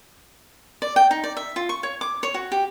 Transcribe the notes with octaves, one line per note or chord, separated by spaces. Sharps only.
D5
G5
D#4
D5
E5
F4
C#6
C#5
D6
C#5
F#4
G4